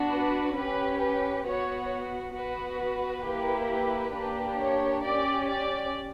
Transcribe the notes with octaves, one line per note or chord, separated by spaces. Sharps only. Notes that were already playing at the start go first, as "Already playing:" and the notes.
Already playing: B3 D4 F#4
B4
C#4 G4 B4
B4
B3 F#4 C#5
B3 F#4 B4
B4
A#3 E4 G4
B4
A#3 D4 G4
C#5
G4 D5
C#4
D5